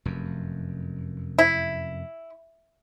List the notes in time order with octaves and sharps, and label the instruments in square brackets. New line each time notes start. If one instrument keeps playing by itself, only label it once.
[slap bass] F1 F#2
[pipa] E4